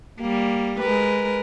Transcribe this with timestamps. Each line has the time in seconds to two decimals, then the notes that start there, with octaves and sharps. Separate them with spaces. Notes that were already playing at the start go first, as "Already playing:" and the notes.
0.20 G3 A#3
0.81 G#3 A#4 B4